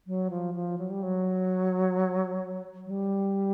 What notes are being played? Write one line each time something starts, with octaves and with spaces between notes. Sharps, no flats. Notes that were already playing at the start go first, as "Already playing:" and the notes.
F#3
F3
F3
F#3
G3
F#3
F#3
G3